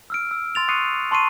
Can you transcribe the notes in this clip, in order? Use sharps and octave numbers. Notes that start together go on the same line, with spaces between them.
E6 F6 D7
E6
C6 A6 F7
C#6 D#6 F#6 C7 C#7 D#7
A5 C6 C#6 C7 D#7